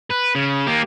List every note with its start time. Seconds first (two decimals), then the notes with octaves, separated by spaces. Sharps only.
0.11 B4
0.35 C#3
0.67 A#3 G4